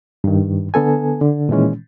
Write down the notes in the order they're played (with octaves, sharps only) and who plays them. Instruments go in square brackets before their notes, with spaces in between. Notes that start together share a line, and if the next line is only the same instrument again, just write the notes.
[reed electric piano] G2 D#3
D3 B3 A4 G#5
D3
A#2 D#3 E3 G#3 C#4